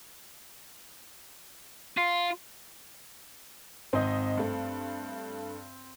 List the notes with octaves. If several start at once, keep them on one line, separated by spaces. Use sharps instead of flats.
F4
G#1 C4 D#5
G2 A3